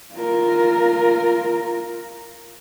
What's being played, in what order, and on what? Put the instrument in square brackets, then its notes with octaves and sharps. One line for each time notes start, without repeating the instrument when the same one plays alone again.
[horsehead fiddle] F4 A#4